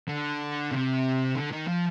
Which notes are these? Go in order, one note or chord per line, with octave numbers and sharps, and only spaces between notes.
D3
C3
D3
D#3
F3